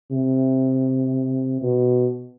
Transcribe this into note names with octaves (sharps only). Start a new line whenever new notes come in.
C3
B2